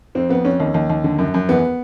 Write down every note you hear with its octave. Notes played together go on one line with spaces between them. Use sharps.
F2 C4
F2 B3
F2 C#4
D#2
D#2
D#2
D3
F#2
F#2
E2 B3